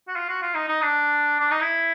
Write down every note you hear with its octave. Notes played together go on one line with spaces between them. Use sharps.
F#4
F4
F#4
F4
D#4
D#4
D4
D4
D#4
E4